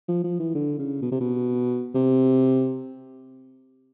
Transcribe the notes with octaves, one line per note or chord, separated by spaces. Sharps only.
F3
F3
E3
D3
C#3
B2
C3
B2
C3